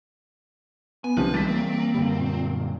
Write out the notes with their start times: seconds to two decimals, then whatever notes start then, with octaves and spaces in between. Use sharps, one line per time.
1.04 B3 G#5
1.17 C2 C3 D#3 F3 B4
1.34 E3 G3 G#3 C4 A6 B6
1.49 A#3
1.94 F#2 D3 G3
2.20 A#2